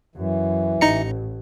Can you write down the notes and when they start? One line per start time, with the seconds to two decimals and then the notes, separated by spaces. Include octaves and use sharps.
0.16 F#2 E3
0.81 A1 D#4 A#5 C#7